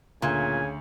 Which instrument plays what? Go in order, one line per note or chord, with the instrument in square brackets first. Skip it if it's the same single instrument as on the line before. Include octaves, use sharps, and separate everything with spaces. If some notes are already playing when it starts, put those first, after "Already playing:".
[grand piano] D2 [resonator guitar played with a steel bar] A#2 [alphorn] C#3 [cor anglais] G#5